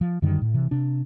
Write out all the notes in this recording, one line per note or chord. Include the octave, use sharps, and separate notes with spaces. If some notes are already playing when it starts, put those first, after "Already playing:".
F3
F#2 D3 D#3 G3
A2
C3 E3
C3 D4